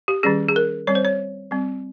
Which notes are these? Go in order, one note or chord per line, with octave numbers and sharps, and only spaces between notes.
G4
D#3 G3 C#4 G#4
G#4
A#4
G3 C4 C#5
C5
C#5
G3 C4